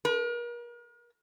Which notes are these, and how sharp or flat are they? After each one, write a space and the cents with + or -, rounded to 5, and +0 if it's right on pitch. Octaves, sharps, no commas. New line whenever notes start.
A#4 +40